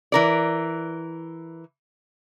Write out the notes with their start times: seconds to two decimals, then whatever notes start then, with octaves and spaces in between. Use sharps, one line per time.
0.12 E3 A#4 D5